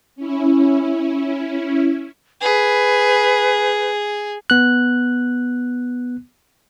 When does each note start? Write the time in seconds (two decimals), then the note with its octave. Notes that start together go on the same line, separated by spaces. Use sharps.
0.16 C#4 E4
2.41 G#4 B4
4.50 B3 F#6